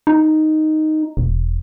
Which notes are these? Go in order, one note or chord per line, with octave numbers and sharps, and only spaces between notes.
D#4
E1